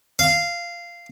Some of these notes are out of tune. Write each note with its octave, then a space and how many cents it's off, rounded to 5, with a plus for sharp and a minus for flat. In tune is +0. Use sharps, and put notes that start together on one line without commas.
F5 -10